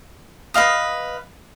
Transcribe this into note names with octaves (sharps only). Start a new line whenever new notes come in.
B4 D#5 F5 D#6